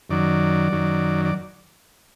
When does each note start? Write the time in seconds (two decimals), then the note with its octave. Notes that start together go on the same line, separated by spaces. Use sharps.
0.10 F#2 D#3 F#3 D5
0.72 F#2 D#3 F#3
1.25 D5